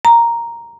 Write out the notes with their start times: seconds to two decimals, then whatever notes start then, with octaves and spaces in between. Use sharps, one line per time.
0.05 A#5